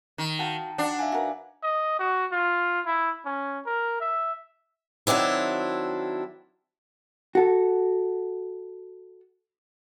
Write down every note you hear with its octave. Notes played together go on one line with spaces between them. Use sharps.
D#3
F#4 F5 G5 A5
D4 F#4 F#5
E5 F5 G#5
F#4 A#4 B4
D#5
F#4
F4
E4
C#4
A#4
E5
D#3 F#3 C4 D4 E4
F#4 A4